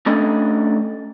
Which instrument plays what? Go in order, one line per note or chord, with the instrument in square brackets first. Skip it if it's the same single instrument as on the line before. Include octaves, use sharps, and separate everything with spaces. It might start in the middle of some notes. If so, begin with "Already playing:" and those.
[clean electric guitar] A3 C#4 D4 A4 D#5 B5